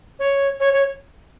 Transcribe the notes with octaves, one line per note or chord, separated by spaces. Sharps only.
C#5
C#5
C#5